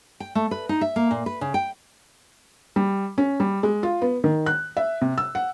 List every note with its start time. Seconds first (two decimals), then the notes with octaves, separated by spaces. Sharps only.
0.20 G5
0.35 A3
0.51 B4
0.69 D#4
0.81 E5
0.96 A#3
1.11 A#2
1.26 B4
1.41 C#3
1.54 G5
2.76 G3
3.18 C#4
3.40 G3
3.63 G#3
3.83 F4
4.02 B3
4.24 D#3
4.46 F#6
4.77 E5
5.01 C3
5.18 E6
5.35 F#5